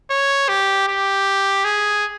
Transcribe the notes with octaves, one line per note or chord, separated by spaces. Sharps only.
C#5
G4
G4
G#4